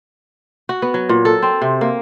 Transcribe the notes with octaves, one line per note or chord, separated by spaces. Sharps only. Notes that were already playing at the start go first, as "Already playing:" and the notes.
F#4
B3
F#3
A#2
A4
C4
C3
A#3